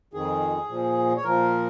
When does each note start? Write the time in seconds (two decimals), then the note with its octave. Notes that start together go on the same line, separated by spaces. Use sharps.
0.14 F2 D#3 G#4
0.69 A#2 F3
1.16 C#5
1.24 A#2 F3 A#4